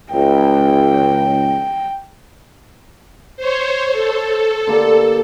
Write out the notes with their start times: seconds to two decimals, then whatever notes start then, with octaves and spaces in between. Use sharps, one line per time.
0.12 C#2 G5
3.37 C5 C#5
3.91 A4
4.67 D3 A#3 G4